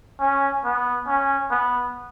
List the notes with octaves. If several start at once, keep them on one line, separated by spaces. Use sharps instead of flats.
C#4
B3
C#4
B3